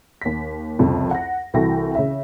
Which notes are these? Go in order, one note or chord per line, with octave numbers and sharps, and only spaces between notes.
D#2 B6
C2 F2 C#3
F#5 A#6
C2 E3 F#4 A4 G5 A#6
C#3 E5